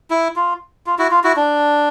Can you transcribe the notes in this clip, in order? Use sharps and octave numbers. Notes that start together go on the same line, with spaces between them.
E4
F4
F4
E4 F#4
F4
E4 F#4
D4